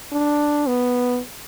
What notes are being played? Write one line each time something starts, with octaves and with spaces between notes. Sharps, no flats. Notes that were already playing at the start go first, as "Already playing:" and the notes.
D4
B3